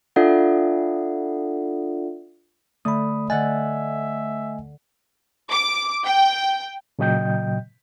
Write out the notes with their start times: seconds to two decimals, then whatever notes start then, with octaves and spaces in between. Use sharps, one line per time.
0.16 D4 F4 A4 D5 E5 F#5
2.85 D3 A3 B5 D#6
3.30 D3 D#5 E5 F#5 G#5 A6
5.51 D6
6.04 G5
6.99 A#2 C#3 F#3 D#5 G5 G6